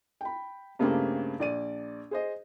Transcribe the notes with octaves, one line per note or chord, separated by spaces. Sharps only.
G5 B5
G2 C#3 A3 A#3 C4 G4
A#1 D5 D#7
G#4 C5 D#5